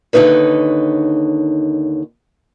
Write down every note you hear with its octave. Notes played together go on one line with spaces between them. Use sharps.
D#2 D3 D#3 D#4 B4 C#5